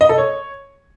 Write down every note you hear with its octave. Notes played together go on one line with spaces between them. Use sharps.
D#5
A4
C#5